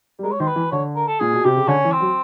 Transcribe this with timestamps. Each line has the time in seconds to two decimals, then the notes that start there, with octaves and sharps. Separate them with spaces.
0.19 G3
0.23 G#3 A#4
0.32 C#5
0.40 D#3 C5
0.47 B4
0.56 E3
0.71 D3 C#5
0.96 A#4
1.07 A4
1.20 A#2 G#4
1.33 B2
1.44 C3 G4
1.57 C#3
1.68 D3 C#4
1.84 E3
1.92 C4
2.00 F#3